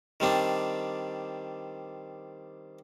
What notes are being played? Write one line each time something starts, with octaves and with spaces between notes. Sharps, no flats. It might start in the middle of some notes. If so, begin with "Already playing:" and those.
D#3 G3 C4 D4